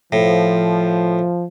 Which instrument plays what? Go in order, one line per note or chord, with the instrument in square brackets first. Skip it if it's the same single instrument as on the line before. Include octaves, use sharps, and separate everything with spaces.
[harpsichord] A2 [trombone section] F3